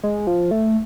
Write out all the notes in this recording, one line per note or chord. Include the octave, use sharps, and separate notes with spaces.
G#3
F3
A3